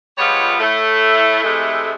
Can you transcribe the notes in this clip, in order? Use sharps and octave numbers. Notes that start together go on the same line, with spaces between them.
F3 G3 G#3 B3 F4 C#5
A2 A3
C3 E3 G#3 A3